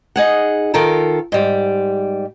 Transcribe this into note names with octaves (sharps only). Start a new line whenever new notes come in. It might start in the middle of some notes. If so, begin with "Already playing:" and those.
D#4 G#4 F#5
D#3 F4 A4 A#4
G#2 G3